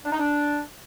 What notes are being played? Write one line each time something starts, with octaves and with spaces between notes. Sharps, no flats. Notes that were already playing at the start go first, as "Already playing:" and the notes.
D4
D#4
D4